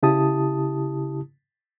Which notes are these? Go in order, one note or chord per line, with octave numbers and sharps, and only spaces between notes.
C#3 E4 G4 A5 D#6